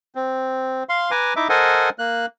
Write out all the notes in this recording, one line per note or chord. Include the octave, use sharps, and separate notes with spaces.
C4
F5 C6
B4 G#5 A#5 D6
D#4 E4 E5 D6
A4 A#4 C5 D#5 F#5 G#5
A#3 F#6